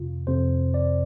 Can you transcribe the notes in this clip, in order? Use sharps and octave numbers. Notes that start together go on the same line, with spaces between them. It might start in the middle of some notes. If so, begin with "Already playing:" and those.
Already playing: F2 C3 F4
F2 C3 C5
D5